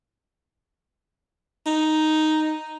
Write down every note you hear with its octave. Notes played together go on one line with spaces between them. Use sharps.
D#4